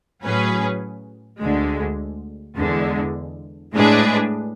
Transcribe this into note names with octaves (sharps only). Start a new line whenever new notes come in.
A2 F#3 C#4 G#4 B4
D2 D3 G#3
E2 D3 G#3
A2 G#3 D4 G#4 B4